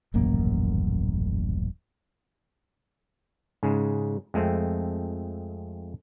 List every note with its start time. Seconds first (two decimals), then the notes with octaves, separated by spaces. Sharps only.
0.14 D#1 A1 F#2 A#3
3.63 G#2 C#3 G#3
4.34 F2 G#3 A3 C4